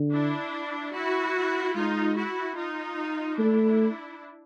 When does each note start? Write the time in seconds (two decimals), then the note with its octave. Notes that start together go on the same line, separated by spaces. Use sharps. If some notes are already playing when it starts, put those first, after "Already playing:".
Already playing: D3
0.12 D4 E4
0.94 E4 F#4
1.75 G#3 D#4 F4
2.16 E4 F#4
2.57 D#4 F4
3.38 A3 D4 E4